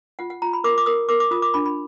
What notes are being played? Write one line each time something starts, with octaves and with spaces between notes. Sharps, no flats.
F4 F#5
F#5
F4 A#5
B5
A#4 D6
D6
A#4 D#6
A#4 D6
D6
F4 D#6
D6
D4 B5
B5